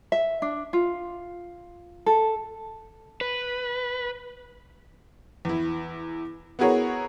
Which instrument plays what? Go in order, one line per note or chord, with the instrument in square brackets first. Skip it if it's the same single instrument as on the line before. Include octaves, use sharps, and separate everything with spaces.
[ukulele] E5
D4
F4
A4
[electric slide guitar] B4
[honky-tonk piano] E2 E4
B3 E4 F#4 G#4 A#4 C#5